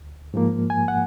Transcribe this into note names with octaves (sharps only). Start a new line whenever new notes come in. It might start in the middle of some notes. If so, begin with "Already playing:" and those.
Already playing: D2
G#2 F3 A#3
G#5
F#5